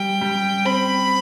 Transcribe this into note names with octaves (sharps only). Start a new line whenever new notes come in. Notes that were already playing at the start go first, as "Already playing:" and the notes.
Already playing: G3 G5
G3
C4 B5